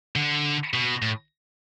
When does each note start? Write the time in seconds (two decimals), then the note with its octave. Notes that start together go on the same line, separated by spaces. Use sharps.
0.16 D3
0.73 B2
1.02 A2